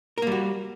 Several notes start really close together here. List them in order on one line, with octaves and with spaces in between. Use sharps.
A#4 A#3 G3 F#4